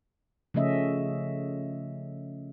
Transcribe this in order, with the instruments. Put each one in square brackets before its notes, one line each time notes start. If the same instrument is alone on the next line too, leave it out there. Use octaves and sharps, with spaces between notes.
[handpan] C#3 F3 A3 C#4 D#5 E5